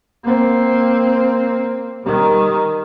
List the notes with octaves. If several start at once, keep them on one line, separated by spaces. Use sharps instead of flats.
A#3 C4
D#3 G3